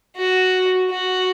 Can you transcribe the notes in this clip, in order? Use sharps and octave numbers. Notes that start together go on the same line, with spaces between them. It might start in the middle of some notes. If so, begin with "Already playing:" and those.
F#4
F#4